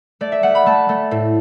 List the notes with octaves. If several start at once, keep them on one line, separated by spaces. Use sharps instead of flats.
A3 D5
E5
A3 F#5
B5
A3 A5
A3
A2